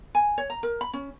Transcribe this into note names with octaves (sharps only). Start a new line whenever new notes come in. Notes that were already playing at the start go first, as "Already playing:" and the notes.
G#5
C#5
A#5
A#4
B5
C#4